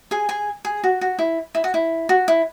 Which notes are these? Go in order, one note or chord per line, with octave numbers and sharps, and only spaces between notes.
G#4 G#5
G#4 G#5
G#4
F#4
F#4
E4
E4
F#4
E4
F#4
E4